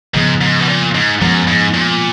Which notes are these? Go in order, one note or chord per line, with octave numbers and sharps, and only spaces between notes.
G#2 C#3 F3 B3
G#2
B2
A#2
G#2
F#2 F3 G#3 B3
G#2
A#2